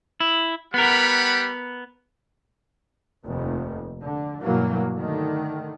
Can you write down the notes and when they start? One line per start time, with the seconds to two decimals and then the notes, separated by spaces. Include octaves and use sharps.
0.20 E4
0.74 G3 B3 A#4 F#5 B5
3.24 F1 D#2 C3
4.01 D3
4.43 G2 B2 E3 F#3 A#3
4.97 D3 D#3 A3